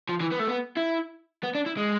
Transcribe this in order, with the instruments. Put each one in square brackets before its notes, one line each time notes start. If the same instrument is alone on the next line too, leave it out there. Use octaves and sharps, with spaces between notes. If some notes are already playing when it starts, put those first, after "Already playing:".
[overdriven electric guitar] F3
E3
B3
A3
B3
E4
B3
D4
E4
G#3